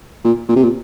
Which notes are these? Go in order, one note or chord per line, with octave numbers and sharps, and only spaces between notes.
A#2
A#2
C3
A#2